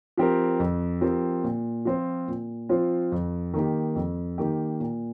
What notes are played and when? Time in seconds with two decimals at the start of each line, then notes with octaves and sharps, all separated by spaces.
0.18 F3 C4 G4 A#4
0.60 F2
1.01 F3 C4 G4 A#4
1.44 A#2
1.85 F3 C4 F4 C5
2.28 A#2
2.69 F3 C4 F4 C5
3.12 F2
3.54 D#3 A#3 G4
3.96 F2
4.38 D#3 A#3 G4
4.80 A#2